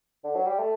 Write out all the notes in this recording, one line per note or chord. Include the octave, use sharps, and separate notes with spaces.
D3
F#3
G3
A3